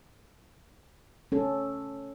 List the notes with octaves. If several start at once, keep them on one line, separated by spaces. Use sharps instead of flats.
C#4 A4